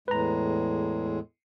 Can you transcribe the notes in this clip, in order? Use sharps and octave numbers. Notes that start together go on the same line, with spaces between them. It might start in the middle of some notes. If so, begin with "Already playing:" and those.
E2 A2 G#3 B4 A#5